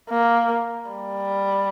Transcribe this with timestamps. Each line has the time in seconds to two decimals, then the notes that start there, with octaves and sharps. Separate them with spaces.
0.10 A#3
0.90 G3